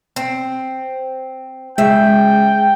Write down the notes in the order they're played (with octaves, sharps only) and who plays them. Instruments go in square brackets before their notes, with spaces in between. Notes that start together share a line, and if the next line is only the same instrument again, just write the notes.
[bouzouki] C4
[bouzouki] C#3 E5 [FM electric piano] G#3 [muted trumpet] G5